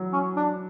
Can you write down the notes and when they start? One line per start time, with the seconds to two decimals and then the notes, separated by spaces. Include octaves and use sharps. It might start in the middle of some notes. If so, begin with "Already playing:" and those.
Already playing: E3 F#3
0.13 C#4
0.37 D4